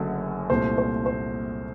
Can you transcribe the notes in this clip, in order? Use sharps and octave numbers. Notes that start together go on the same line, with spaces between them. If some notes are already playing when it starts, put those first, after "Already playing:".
Already playing: F#1 F#2 D3 F#3 A3
C2 A#2 A3 C5
C5
C5